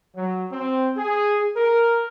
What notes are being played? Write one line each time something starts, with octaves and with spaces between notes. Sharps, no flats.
F#3
C4
G#4
A#4